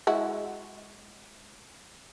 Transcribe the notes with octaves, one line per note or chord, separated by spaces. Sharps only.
G#3 E4 F#4